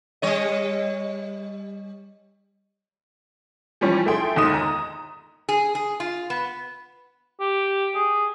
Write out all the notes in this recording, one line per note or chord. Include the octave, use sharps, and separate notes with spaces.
G3 C#5 D#5
E3 F3 G3 C#4
A3 E4 G#4 G5 C6
G1 D#2 G#3 D#4 D#6 E7
A#5
G#4
G#4
F4
B3
G4
G#4